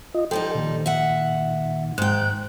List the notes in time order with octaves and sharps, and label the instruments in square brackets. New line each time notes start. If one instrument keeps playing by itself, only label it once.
[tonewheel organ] F4 D#5
[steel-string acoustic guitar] F3 G3 D#4 [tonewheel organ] A4 G5
[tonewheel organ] A#2 D#3
[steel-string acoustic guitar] E5 F#5
[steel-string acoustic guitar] G#2 G5 [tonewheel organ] F#6